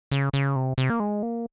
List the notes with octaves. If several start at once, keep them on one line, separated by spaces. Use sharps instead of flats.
C#3
C#3
C3
C3
A#3
G#3
A#3